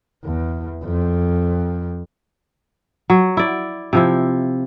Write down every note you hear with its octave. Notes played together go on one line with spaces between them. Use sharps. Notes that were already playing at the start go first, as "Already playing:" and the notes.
E2
F2
F#3
E4 D5
C3 F3 E4